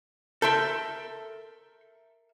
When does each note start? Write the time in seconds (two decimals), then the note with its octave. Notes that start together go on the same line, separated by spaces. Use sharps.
0.42 A4 A#4 E5 C6 G6